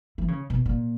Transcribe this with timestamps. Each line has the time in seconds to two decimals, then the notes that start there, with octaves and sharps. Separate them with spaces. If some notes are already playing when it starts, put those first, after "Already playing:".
0.18 E3
0.28 C#3
0.50 B2
0.66 A#2